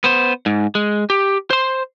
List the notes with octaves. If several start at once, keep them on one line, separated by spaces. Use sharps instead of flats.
B3 C5
G#2
G#3
G4
C5 C6